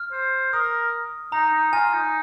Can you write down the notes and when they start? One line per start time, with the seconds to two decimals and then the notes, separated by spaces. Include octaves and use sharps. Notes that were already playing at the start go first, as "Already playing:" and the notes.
Already playing: F6
0.12 C5
0.53 A#4 D#6
1.32 D#4 A#5
1.53 D#4
1.73 F4 G#5
1.93 D#4